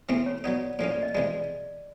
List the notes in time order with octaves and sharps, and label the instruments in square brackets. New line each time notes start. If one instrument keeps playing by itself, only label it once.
[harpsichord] E2 C3 E3 A3 C4
[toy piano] C#5
[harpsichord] F#3 B3 D#4 [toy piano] D5
[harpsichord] A2 F3 A#3 C#4 [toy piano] D5
[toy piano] D5
D#5
[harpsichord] C3 E3 G#3 [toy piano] D5